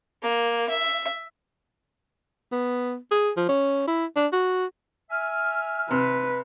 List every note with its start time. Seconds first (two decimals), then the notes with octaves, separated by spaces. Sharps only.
0.22 A#3
0.69 E5
2.52 B3
3.11 G#4
3.37 F3
3.49 C#4
3.87 E4
4.16 D4
4.32 F#4
5.11 E5 G#5 F6
5.91 C3 B4